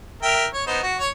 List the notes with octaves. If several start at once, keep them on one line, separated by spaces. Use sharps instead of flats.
A#4 E5 G5
C#5
B3 D#4 C5
F#4
C#5